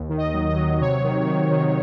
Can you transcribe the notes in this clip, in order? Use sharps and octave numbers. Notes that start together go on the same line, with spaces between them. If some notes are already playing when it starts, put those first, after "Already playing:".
Already playing: D#2
D#3
D#5
F#3
D#5
F#3
C3 C#5
D#3
D#3
D#3